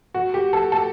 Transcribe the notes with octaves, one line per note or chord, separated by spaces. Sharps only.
F#4
G4
A4
A4